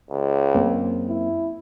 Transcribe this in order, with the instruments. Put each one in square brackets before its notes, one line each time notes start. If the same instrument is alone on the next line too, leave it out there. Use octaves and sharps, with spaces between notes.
[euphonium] C#2
[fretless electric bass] F#2 A#3 C4
[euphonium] E4